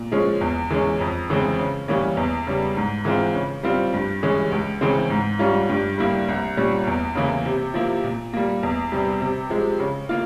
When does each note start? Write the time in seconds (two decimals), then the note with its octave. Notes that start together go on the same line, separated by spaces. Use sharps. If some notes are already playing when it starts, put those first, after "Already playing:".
Already playing: A#2
0.12 F3 G#3 C#4
0.41 E2
0.70 E3 G#3 C#4
1.01 F2
1.30 C#3 E3 G#3 C4
1.59 C#3
1.88 E3 G3 A#3 C#4
2.17 E2
2.47 C#3 G3
2.77 G#2
3.05 E3 G#3 C4 F4
3.34 C#3
3.63 G3 C4 F4
3.94 G2
4.23 E3 G#3 C#4
4.52 C#2
4.81 C#3 E3 G#3 C4
5.10 G#2
5.39 G3 C#4 F4
5.69 G2
5.98 G3 A#3 E4
6.28 C2
6.57 A#2 G3 C#4
6.87 E2
7.15 C#3 E3 A#3 E4
7.46 C3
7.74 F3 A#3 E4
8.04 A#2
8.33 G3 A#3
8.63 E2
8.92 C3 G3
9.22 C3
9.50 F3 G#3
9.80 C#3
10.09 A#3 F4